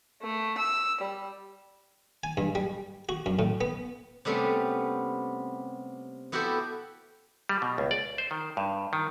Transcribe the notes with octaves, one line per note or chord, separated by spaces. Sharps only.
A3
E6
G3
G#5
G2
G3
F#4
F#2
A2
B3
C3 G3 A3 B3 C#4
B3 E4 F#4 G4 A4 C5
G3
B2
C#2
D5
C5
D#3
G2
D#3